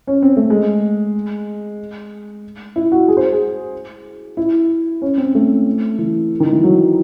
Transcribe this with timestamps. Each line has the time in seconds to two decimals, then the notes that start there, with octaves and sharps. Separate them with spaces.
0.07 C#4
0.22 C4
0.37 A3
0.50 G#3
2.76 E4
2.92 F#4
3.08 G#4
3.17 C5
3.32 G#4
4.37 E4
5.02 C#4
5.18 C4
5.35 A3
5.99 E3
6.40 D#3
6.52 E3
6.64 F#3